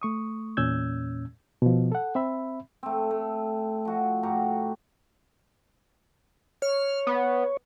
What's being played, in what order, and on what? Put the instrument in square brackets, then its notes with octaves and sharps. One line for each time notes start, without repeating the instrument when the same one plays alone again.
[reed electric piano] A3 C#6 D#6
E2 A#2 C#4 E6 G6 G#6
B2 F3
A4 F#5
C4 E5 B5
[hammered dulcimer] A3 C4
A3
F3 F#4
A2 F#4 G4 A#5
[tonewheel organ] C#5 [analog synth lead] F6
[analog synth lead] B3